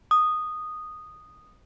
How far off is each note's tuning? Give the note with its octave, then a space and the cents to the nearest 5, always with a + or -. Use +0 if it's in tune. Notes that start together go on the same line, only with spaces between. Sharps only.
D#6 -10